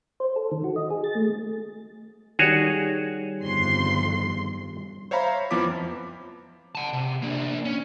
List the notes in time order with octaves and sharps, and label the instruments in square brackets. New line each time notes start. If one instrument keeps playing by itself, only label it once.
[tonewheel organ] C5
A4
D#3
F#4
D#5
G#4
A6
A3
[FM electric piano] D#3 G3 [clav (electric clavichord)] F#4 G#4 C#5
[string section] G1 F2 C6
[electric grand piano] C5 C#5 E5 F5 A#5 B5
F2 F3 B3 E4 D6 B6
[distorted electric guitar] F#5 A5
C3
A#3 D4
C#4